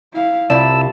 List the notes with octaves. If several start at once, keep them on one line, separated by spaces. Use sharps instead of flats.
E4 F5
C2 E4 F4 D5 A5 E6